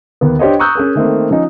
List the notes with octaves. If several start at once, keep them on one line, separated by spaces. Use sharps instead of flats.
D#2 B3
D4 G4 C5 C#5 D#5
A#5 C#6 D#6 E6 F#6 G6
C#4 G#4 A#4
D#3 A3 A#3 C4
F3 C#4 D#4